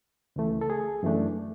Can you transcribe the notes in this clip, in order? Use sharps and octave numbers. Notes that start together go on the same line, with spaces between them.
C#2 C#3 E3 A3
A4
G#4
F#2 E3 A3 D4